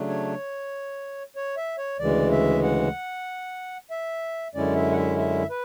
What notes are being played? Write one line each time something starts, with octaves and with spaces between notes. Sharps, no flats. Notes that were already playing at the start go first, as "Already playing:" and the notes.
Already playing: C#3 F#3 A3 D4
C#5
C#5
E5
C#5
D2 C#3 E3 G#3 D5
E5
F#5
E5
F#2 D3 G#3 C#4 E4 D5
E5
F#5
E5
E5
B4